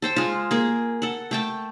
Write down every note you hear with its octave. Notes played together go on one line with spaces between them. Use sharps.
A4 C5 G5
G#3 F4
A#3 G#4
A4 F#5
A3 G5 A5